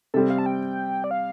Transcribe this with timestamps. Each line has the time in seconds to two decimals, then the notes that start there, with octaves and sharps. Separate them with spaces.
0.14 C3 G3 C4 A4
0.30 F5
0.38 A5
0.46 G5
1.04 D5
1.11 F5